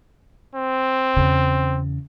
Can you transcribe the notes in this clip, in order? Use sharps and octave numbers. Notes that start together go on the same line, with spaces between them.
C4
E2 C#3